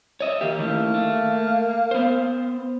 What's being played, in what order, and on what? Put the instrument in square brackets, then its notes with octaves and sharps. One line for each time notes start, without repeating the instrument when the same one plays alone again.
[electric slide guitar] C#5 D#5 E5
[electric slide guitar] D#3 G4 [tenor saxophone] A#3
[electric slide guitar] D#3 A3 E4
A3
B3 C5